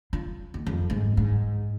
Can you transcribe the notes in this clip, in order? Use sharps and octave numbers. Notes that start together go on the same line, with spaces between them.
F4
D#2
F2
G#2
G#2